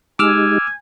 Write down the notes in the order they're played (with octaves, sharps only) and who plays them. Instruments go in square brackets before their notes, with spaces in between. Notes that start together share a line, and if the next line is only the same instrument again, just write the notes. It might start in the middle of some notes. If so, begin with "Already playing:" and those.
[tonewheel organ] G#3 D#4 G4 [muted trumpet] G#5 [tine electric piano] D6 E6 F6